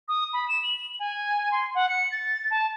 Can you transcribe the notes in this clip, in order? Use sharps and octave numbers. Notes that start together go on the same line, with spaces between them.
D#6
B5
E7
F#7
G#5
C6
F#5
C#7
A6
A5